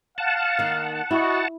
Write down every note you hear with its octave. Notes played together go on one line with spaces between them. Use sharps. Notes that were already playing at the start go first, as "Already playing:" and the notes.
F5 F#5 A5
D#3 A#3
E4 F#4 D#5